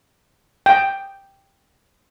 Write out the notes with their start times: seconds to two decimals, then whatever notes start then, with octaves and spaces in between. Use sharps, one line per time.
0.66 G5